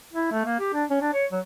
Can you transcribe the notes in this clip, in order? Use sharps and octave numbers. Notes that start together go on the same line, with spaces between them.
E4
A3
A#3
G4
D4
C#4
D4
C#5
F#3